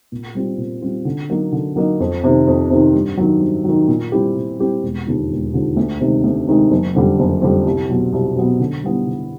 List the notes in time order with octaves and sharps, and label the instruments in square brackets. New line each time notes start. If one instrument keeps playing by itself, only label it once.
[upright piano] A#2
G3 C4 F4
A#2
G3 C4 F4
D3
F#3 A#3 D#4 F#4
D3
F#3 A#3 D#4 F#4
F2
C3 D#3
F2
C3 D#3
G2
D#3 F#3
G2
D#3 F#3
A#2
G3 C4 E4 G4
A#2
G3 C4 E4 G4
E1
D#2 D3 F3
E1
D#2 D3 F3
D2
C3 D#3 G#3
D2
C3 D#3 G#3
F#1
F2 D3 G3
F#1
F2 D3 G3
C2
B2 F#3 B3
C2
B2 F#3 B3
D3
G3 B3 E4
D3